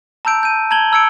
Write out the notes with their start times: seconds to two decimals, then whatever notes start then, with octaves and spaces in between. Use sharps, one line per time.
0.25 A5 A#5 E6 G6 D7
0.43 G6 D#7
0.71 A5 A#5 G#6 F#7 G7
0.92 A#5 E6 G#6 C#7 D7